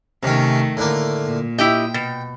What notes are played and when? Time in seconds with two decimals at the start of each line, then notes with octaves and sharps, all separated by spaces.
0.23 C3 D#3 A3 C#4
0.77 A2 D3 A#3
1.25 A#2
1.59 E4 G4 D#5 G5
1.94 B2